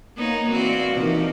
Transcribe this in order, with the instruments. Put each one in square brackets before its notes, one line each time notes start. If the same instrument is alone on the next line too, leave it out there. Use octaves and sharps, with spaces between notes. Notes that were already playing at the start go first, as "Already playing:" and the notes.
[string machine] A#3 [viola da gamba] B3 D#4 C#5
[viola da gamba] E3 C4 F#4 [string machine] D5 F5
[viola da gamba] C3 F3 [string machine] E3 D#4 A#4